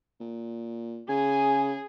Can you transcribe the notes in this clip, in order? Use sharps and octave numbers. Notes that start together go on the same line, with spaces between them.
A#2
C#3 G#4 G#5